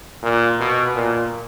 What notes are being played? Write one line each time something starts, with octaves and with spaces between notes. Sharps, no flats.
A#2
B2
A#2